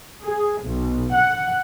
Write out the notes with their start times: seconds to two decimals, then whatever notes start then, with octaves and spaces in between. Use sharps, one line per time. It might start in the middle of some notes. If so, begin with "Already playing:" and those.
0.24 G#4
0.63 B1
1.14 F#5